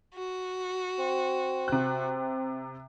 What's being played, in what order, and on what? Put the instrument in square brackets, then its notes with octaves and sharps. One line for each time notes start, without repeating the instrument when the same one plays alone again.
[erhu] F#4
[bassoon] C4
[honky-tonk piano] C3 F#6